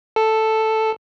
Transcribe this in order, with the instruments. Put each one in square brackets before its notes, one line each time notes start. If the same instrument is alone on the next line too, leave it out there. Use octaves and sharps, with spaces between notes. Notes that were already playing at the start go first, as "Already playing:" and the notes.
[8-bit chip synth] A4